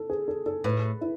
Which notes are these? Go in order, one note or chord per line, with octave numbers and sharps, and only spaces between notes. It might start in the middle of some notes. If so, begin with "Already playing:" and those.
Already playing: A4
G#4
A4
A4
A2 B4
E4